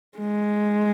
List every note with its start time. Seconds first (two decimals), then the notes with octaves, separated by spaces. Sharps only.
0.18 G#3